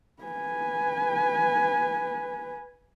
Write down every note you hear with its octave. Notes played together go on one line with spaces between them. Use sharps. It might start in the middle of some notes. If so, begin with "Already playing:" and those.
B4 G#5